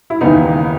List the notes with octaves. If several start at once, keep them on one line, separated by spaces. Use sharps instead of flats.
E4
D#2 C#3 E3 B3 D#4